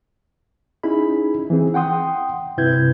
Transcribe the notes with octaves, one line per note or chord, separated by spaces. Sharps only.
C#4 D#4 E4 G#4 B5
E3 C4 G#4
F#5 G5 C6 D#6
G2 C3 E4 B4 G6 G#6